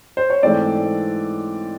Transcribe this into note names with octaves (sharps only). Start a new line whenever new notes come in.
C5
C#5
G#2 E3 A3 C4 D5